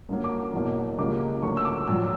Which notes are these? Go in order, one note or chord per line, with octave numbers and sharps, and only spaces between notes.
F#2 D3 F#3 A#3
D6
E2 B2 F#3 A#3
C#2 C#3 G3 A#3 D6
D2 D3 F#3 A#3 C#6
E6
D6
A#1 A#2 F#3 E6